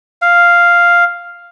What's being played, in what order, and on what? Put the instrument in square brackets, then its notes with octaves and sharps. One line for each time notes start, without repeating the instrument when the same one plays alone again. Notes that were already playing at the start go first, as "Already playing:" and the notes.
[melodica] F5